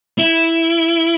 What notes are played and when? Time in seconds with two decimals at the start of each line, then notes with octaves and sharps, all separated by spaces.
0.19 E4